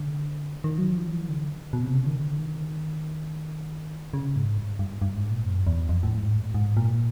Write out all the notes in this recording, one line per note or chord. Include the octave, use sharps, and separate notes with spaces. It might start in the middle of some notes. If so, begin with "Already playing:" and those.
Already playing: D3
D#3
F#3
F3
E3
D3
B2
C3
C#3
D#3
D3
D#3
C#3
G#2
G2
G2
G2
G#2
A#2
F#2
E2
F2
A2
G#2
A2
G#2
A#2